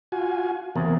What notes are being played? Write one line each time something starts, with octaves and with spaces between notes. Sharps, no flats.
F4 F#4 G#5
E2 C3 A#3